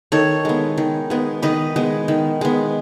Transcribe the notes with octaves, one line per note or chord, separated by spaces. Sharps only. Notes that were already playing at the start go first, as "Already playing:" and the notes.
D#3 A4 C#5
G#3 B3
D#3
G#3 B3
D#3 B4 D#5
G#3 B3
D#3
G#3 B3